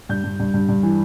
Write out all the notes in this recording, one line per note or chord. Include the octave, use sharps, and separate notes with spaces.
G2 G6
G2
G2
G2
G2
E3